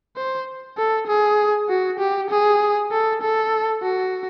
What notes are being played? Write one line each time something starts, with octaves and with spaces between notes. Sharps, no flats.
C5
A4
G#4
F#4
G4
G#4
A4
A4
F#4